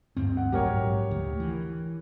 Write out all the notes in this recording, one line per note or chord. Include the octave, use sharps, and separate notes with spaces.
D2 G2 C4
F#5
A#1 G#2 F#3 G4 A#4 C#5
D2
E3